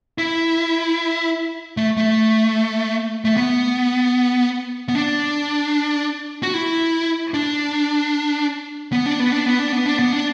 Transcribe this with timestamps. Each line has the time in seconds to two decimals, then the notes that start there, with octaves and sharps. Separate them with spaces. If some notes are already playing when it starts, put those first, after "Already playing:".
0.18 E4
1.77 A3
1.97 A3
3.25 A3
3.37 B3
4.89 B3
4.95 D4
6.43 F#4
6.54 E4
7.34 D4
8.93 B3
9.06 D4
9.20 B3
9.32 D4
9.46 B3
9.59 D4
9.72 B3
9.86 D4
9.99 B3
10.13 D4